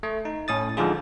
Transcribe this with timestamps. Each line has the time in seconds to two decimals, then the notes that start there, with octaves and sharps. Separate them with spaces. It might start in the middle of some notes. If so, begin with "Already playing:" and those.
0.03 A3
0.25 D#4
0.48 A2 C#4 D#6 A6
0.77 D3 F3 G#3 D#4 F4 G#4